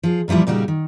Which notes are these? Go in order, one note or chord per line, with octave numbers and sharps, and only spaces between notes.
F3 G#4
A#2 E3 F3 G3 E4
A#2 C#3 G3 D#4 F#4 G4
D#3